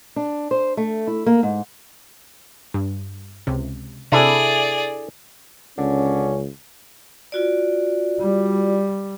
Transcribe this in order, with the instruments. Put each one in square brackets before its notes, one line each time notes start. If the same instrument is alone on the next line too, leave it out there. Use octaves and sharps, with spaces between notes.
[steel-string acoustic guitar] D4
C5
A3
E4
A#3
G#2
[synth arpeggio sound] G2
C#2 C3
[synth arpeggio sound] C3 [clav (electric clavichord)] D4 E4 A4 [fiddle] G#4 D5
[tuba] C#2 [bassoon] D3 [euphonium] C#4
[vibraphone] F4 F#4 D5
[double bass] G3